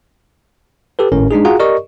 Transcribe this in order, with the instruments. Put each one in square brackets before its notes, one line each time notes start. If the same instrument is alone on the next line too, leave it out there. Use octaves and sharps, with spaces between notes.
[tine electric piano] G4 A4 B4
G#1 A2 C#4 A#4
G#3 D4 D#4 G#4
F4 F#4 G#4 F5 F#5 A#5
G4 A#4 D5 D#5 C#6